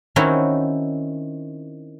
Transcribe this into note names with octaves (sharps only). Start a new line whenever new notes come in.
D#3 C4 C#4 E4 F#4 C#5